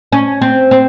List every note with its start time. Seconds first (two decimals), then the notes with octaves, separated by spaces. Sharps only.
0.12 C#4
0.41 C4
0.71 C4